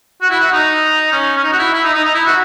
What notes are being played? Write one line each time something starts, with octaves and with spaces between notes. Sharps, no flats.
F#4
E4
F#4
D#4
C#4
C#4
D#4
F#4
E4
E4
D#4
D#4
D#4
E4
F#4